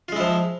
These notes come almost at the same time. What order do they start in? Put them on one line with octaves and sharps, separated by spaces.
F4 G#3 E4 F3